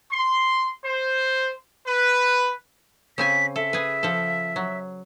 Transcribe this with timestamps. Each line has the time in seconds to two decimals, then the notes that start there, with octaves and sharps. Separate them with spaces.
0.11 C6
0.84 C5
1.86 B4
3.18 C#3 C4 G#5 B6
3.56 A4 E5
3.73 G#4 B4
4.03 F3 A4
4.56 F#3